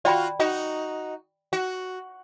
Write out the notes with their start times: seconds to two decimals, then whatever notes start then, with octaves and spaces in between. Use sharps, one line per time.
0.05 F4 F#4 D5 G5 B5
0.40 D#4 F#4
1.53 F#4